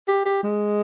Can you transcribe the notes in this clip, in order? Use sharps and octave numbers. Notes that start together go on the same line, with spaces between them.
G4
G4
G#3